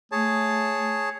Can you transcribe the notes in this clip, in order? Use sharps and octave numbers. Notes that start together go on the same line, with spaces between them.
A3 G#4 C#5 A5